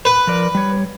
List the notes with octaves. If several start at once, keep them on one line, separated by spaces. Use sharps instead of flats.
B4
F3 A#4 D5
G3 C#5